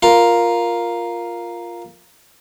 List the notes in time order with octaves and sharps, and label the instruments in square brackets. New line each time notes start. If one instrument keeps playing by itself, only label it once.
[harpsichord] F4 A#4